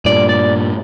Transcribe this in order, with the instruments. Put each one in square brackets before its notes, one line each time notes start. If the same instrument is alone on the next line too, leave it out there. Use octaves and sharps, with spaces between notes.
[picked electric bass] G2 A#2 [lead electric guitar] D5
[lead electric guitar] D5